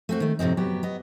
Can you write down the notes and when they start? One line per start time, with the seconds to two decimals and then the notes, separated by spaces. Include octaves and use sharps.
0.09 A3 C4 F#4
0.20 D#3 A3
0.39 A2 C3 F3 C4 D#4
0.57 F#3 B3 G4
0.83 B3 D#5